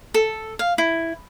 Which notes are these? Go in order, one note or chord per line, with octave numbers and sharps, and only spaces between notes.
A4
F5
E4